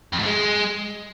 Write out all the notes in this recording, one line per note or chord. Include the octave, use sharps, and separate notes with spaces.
F2
G#2
G#3